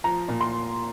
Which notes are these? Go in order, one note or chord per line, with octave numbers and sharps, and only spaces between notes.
F3 A#5
A#2
C6